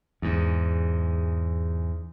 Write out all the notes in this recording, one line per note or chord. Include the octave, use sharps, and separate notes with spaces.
E2 G#2